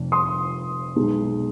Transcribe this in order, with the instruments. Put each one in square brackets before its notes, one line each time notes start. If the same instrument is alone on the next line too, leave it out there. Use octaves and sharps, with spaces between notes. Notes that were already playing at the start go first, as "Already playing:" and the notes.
Already playing: [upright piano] F1 F2
C6 D#6
B1 B2 G#3